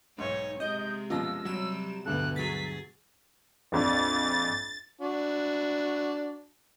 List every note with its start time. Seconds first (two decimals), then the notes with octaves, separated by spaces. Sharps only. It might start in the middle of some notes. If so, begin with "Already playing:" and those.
0.18 B1 G#2 D#4 C#5
0.60 C3 G#3 D#5 G6
1.10 F#2 B2 F3 F4 E6 A#6
1.45 C3 F#3 G3 E7
2.06 D2 G2 B2 G3 A4 F#6
2.36 F#3 G#4 A6 B6
3.72 A#1 F2 D4 A6
5.01 D4 F#4